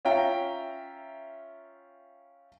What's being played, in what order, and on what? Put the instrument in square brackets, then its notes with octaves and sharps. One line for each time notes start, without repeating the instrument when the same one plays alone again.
[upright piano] C#4 F4 E5 G5 A#5